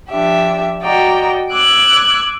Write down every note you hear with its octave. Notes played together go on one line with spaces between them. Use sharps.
F3 D4 G4 E5
F#4 D5 D#5 G5 A#5
D6 E6 F#6 G#6